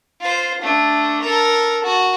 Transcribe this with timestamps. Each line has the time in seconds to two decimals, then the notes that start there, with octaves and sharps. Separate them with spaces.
0.20 F4 C5
0.62 A3 D4
1.22 A4 A#4
1.83 F#4